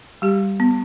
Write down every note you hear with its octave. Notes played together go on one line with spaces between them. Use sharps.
G3 G4
B3